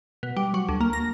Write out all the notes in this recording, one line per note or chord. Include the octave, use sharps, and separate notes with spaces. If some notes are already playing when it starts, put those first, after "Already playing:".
B2
G3
F#3
D2
A#3
A#6